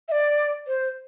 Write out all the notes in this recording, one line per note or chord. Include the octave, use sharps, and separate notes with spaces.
E5
D5
C5